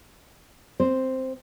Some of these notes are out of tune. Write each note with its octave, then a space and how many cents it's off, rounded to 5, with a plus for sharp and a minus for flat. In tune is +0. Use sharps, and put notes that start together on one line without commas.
C4 +0 C5 +0